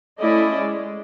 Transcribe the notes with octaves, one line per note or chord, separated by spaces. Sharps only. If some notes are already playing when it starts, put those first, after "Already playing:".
A3 C#4 E4 D5 D#5
G#3